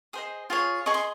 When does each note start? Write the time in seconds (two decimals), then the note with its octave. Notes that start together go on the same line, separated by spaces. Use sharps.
0.13 G#4 C5 D#5 D#6
0.50 F4 G#4 C#5
0.86 G#4 D#5 C#6
0.94 C6